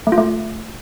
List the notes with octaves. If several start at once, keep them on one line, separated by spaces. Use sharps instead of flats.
A3
F4
A3